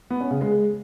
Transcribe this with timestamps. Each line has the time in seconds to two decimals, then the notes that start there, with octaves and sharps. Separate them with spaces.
0.10 B3
0.21 C#4
0.31 C#3
0.41 G#3